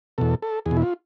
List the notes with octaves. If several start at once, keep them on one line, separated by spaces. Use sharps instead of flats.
E2 B2 A4
A4
E2 G#4
B2
E4
F4